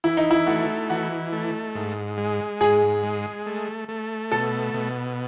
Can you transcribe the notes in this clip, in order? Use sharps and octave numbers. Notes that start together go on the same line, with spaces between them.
E3 E4
D#4
E4
A3 F#4
E3 F#4
A3
G#2
G#3
G#2 G#4
G#3
A3
A3
B2 A4
B2